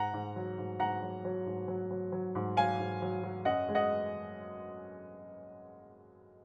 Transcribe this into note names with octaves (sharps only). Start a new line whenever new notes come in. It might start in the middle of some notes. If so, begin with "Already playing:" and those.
Already playing: G#2 F#5 A#5
G#2
F#3
G#2
G#2 F#5 A#5
F#3
F#3
G#2
F#3
F#3
F#3
G#2
F#3 F5 G#5
G#2
F#3
F#3
F#2 D#5 F#5
G#3
D#5 F#5